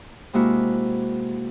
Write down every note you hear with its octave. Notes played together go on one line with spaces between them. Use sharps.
C3 G#3 A#3 E4 F#4